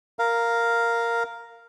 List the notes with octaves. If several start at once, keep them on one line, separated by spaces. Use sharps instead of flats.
A#4 F5